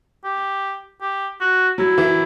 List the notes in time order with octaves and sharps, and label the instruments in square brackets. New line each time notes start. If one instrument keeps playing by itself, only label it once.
[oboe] G4
G4
F#4
[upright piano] F#3 [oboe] E4
[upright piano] E3